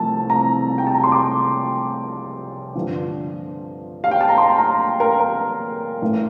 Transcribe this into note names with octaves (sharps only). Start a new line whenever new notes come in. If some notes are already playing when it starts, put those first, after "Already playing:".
Already playing: C2 C3 F3 A3 C4 A5
A#5
G5
A5
A#5
C6
D6
G2 D3 F3
F5
G5
A5
A#5
C6
A#5
A#4
A#4
A1 A2 E3 A3